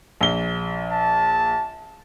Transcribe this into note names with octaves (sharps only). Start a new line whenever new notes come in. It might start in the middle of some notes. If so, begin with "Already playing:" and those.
A#1 G7
A5